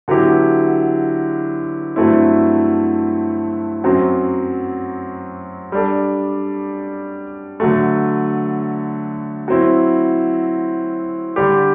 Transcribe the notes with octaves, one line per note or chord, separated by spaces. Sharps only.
D3 F#3 B3 E4 G4
G2 F#3 A3 C4 E4
F#2 F#3 C4
G3 D4 A4
D3 F#3 A3
F#3 C4 E4
D3 G3 D4 G4